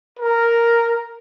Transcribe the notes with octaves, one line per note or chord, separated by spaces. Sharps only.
A#4